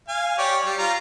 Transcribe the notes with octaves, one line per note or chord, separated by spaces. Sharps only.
F5 G#5
G4 C#5 D5
G3
F4 A#5